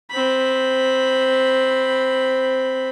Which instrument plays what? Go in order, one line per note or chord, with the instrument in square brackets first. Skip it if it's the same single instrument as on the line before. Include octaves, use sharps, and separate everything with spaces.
[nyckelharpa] C4 B5